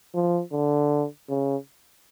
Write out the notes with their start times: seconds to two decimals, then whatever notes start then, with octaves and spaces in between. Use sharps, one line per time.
0.14 F3
0.52 D3
1.29 C#3